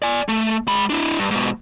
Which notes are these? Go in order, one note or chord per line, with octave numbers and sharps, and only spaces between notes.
D5 G#5
A3
G#3 B5
D4 E4
G2
G#2 B2